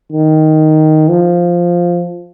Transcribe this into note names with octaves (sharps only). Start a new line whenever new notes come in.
D#3
F3